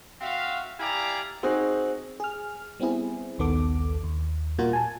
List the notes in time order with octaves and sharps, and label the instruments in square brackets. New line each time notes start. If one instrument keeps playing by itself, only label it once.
[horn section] C4 F#4 E5 F5
E4 G4 D5 F5 G#5 A#5
[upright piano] C4 D#4 F#4 G#4
[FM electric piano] G#4 F6
G3 B3 C4 E4 G#4
A#1 D#2 D#3 B3 A4 D6
D#2
A#2 G3 A#3 F4 F#4 A#4
G#5 A5